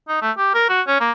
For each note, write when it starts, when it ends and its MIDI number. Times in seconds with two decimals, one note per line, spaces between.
0.08 0.18 63
0.22 0.31 57
0.37 0.51 67
0.54 0.65 70
0.69 0.81 66
0.87 1.00 61
1.00 1.12 58